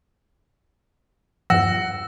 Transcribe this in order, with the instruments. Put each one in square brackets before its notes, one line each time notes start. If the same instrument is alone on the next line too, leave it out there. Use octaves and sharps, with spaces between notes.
[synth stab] E2 G2 F3 [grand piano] F#5 [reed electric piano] E6 [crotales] A#6